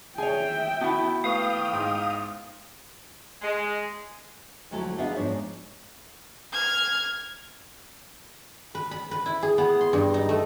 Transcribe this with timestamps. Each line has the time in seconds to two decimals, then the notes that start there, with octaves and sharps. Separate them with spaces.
0.18 G#4 C#5 E5 G5 G#5
0.81 B3 E4 F#4 A5
1.24 A3 B4 F5 G5 C#6 D#6
1.73 G#2
3.42 G#3
4.71 D2 F3 F#3 A3 E4 A4
4.98 B3 D4 D#4 G#4 E5 F5
5.16 G#2 F3 D4 C#5
6.53 F6 G#6
8.75 B4
8.91 B5
9.11 B4
9.26 E4
9.43 G#4
9.58 B3
9.81 C6
9.93 G2
10.14 D#4
10.29 A3